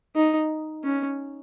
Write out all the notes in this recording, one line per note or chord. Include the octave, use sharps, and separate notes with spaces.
D#4
C#4